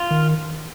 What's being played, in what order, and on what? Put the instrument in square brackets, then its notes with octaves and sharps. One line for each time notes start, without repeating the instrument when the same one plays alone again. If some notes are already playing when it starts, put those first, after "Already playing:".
Already playing: [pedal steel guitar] F4
[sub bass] D#3